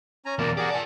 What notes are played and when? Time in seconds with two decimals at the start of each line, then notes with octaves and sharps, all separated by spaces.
0.26 C#4 G#5 A#5
0.39 E2 B2 A#3 A#4 D5
0.57 G4 G#4 A#4 D5 F#5
0.70 D5 G#5 A5